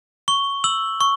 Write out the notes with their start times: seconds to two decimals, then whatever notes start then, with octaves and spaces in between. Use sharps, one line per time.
0.28 C#6 G7
0.64 E6 F#7
1.01 C#6